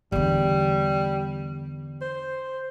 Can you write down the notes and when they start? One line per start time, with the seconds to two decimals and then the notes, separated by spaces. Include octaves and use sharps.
0.12 E2 D3 G3
2.02 C5